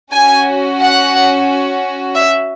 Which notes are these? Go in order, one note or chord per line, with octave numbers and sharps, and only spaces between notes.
C#4 F#4 G#5
F#5
E5